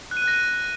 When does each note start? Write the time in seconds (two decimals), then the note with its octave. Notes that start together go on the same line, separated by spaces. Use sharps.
0.11 F#6
0.17 D#7
0.22 F#6
0.28 A#6
0.33 D#7